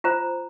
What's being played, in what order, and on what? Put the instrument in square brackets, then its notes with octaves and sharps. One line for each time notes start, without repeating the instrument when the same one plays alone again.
[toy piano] F4 C5 A#5